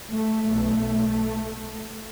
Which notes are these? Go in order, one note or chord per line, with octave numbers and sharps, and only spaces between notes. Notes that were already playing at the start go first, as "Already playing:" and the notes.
A3
B1 B2 A3